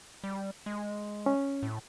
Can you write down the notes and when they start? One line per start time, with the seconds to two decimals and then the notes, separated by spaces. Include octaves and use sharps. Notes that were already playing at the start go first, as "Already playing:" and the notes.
0.24 G3
0.66 G#3
1.26 C#4
1.63 A2